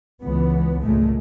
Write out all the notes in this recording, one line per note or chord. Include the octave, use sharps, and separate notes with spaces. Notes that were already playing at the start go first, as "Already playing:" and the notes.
C#2 E3 B3
G#1 C#2 A#2 G#3 A3